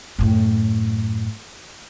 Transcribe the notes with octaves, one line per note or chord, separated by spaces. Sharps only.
F#2 A2